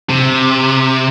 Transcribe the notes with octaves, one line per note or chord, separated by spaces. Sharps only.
C3